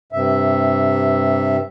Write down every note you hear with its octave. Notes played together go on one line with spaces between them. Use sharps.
G2 C3 E5